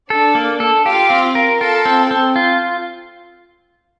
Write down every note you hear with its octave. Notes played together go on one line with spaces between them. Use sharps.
D4 A4 D5
A#3
A4
F4 G4 F5
C4
A#4
F4 A4 A5
C4
C4
F4